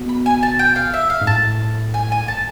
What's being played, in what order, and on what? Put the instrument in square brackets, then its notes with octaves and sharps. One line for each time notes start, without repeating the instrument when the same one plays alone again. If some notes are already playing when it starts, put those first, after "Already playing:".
Already playing: [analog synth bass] B2
[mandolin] B5
G#5
A5
G5
F5
E5
F5
[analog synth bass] G#2
[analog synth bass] A2 [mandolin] A5
[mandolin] G#5
G#5
A5